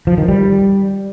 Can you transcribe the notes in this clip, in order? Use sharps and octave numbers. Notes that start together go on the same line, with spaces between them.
F3
D#3
G3